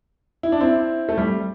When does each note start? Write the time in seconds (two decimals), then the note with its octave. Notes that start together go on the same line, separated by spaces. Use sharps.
0.43 E4
0.52 D4
0.61 C4 E4
1.09 A3
1.18 G3